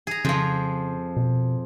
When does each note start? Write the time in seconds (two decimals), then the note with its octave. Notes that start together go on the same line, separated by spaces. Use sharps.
0.07 G#4 A#5
0.25 F2 C#3 F3
1.17 B2